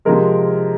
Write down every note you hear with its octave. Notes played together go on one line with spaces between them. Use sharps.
C3 F3 G#3 A#4